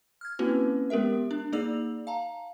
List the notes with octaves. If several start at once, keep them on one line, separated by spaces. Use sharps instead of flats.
F6 G#6
A#3 C4 C#4 E4 F#4 B4
G#3 B3 G4 A#4 E5
D4
A#3 D#4 G#4 D5 E6 F7
F5 A5 A#5